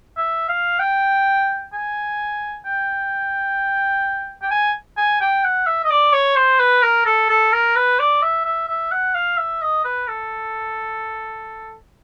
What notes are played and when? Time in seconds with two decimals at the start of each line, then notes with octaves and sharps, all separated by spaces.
0.18 E5
0.49 F5
0.80 G5
1.73 G#5
2.65 G5
4.42 G5
4.51 G#5
4.98 G#5
5.21 G5
5.44 F#5
5.67 E5
5.85 D#5
5.90 D5
6.13 C#5
6.36 C5
6.60 B4
6.83 A#4
7.06 A4
7.29 A4
7.53 A#4
7.76 B4
7.99 D5
8.22 E5
8.45 E5
8.68 E5
8.92 F#5
9.15 F5
9.38 E5
9.62 D#5
9.85 B4
10.08 A4